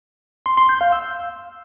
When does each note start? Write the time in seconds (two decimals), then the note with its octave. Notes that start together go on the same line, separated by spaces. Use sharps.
0.46 C6
0.57 C6
0.69 G6
0.81 F5
0.92 E6